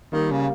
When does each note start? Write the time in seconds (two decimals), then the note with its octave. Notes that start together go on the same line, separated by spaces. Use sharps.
0.13 D#3 G3 A#3
0.31 C#3